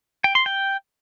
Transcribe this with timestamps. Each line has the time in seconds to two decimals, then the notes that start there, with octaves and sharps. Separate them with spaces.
0.24 G5
0.35 C6
0.46 G5